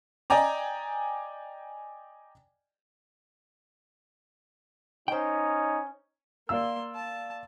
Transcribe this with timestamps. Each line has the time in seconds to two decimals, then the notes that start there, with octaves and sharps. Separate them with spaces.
0.30 D5 D#5 G5 G#5 A#5 D6
5.08 C#4 D#4 C5 G5
6.49 A#3 D5 F5 C6 E6
6.95 A5